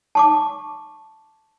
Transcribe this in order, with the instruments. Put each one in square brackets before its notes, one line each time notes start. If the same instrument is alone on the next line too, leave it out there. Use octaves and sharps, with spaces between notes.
[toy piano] A5 C#6 D6